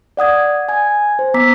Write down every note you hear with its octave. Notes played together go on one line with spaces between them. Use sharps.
D5 F#5 D#6 G#6
G#5 G#6
C5
B3 A#5 D6 E6 B6